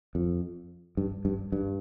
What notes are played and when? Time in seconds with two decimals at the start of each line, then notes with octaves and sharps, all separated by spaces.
0.15 F2
0.97 G2
1.25 G2
1.52 G2